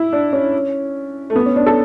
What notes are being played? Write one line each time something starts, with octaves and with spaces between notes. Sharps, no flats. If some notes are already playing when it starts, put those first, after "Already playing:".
Already playing: E4
D4
C#4
A3
B3
C#4
D4
A4